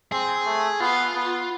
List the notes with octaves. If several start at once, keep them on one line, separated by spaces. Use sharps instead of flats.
C4 G#4
A3
B3 F4
B3